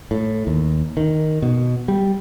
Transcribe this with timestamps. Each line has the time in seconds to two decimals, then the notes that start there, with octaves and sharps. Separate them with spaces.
0.11 A2
0.47 D#2
0.97 D#3
1.42 B2
1.88 G3